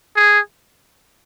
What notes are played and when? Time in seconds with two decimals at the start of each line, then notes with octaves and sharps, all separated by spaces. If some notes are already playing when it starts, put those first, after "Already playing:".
0.16 G#4